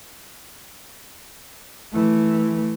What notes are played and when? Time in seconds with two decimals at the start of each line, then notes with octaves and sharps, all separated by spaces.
1.93 E3 A3